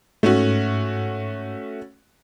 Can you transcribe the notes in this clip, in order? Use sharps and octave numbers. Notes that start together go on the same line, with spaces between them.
G#2 A3 C#4 F#4